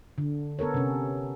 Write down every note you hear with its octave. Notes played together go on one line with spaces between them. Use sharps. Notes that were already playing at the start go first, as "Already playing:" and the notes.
D3
B3 A4 A#4 C#5
C3 C#4